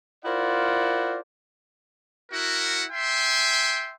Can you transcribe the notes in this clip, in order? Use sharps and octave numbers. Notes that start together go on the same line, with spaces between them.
E4 F4 A#4 C5 D5 F#5
E4 F#4 A#4 F#5
E5 G5 G#5 C6